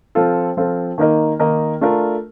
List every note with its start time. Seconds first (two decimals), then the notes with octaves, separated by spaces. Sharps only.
0.15 F3 C4 F4 A4
0.57 F3 C4 F4 A4
0.98 D#3 A#3 D#4 A#4 D#5
1.39 D#3 A#3 D#4 A#4 D#5
1.81 A3 D4 F4 A#4